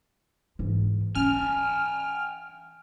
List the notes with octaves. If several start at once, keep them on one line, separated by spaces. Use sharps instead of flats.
G#2 E3
E3 C#4 G5 G#5 F6